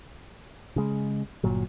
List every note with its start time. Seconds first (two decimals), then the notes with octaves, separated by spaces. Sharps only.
0.76 C#3 G#3
1.44 G1 A#2 F#3